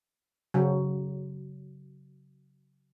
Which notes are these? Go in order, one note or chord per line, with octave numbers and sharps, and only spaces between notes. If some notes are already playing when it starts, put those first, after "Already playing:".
C#3 F#3